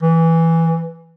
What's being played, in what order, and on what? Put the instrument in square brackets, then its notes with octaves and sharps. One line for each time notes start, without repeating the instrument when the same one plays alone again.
[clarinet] E3